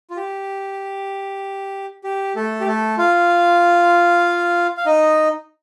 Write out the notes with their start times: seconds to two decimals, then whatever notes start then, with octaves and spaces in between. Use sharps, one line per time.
0.10 F4
0.17 G4
2.04 G4
2.36 A3 A4
2.61 G4
2.67 A3 A4
2.98 F4 F5
4.77 F5
4.86 D#4 D#5